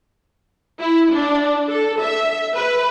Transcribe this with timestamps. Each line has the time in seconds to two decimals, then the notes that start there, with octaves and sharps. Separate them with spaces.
0.81 E4
1.13 D4
1.69 A4
2.01 E5
2.55 B4